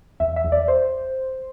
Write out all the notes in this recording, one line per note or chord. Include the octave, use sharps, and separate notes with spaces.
E2 E5
E5
E2
D5
C5